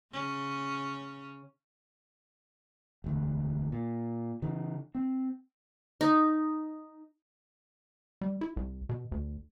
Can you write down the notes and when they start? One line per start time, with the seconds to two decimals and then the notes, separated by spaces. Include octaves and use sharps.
0.13 C#3 C#4
3.04 E1 D2
3.72 A#2
4.42 C#3 E3
4.95 C4
6.01 D#4
8.21 G3
8.41 E4
8.57 C2
8.89 B2
9.12 D2